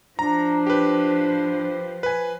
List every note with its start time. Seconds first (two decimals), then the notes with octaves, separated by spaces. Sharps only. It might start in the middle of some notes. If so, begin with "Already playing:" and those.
0.19 F3 D4 C5 A#5
0.66 G4 B4
2.03 B4 G#5